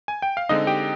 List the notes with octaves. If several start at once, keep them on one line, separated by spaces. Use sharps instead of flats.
G#5
G5
F5
D3 G#3 C4 D#4 D#5
G4 G5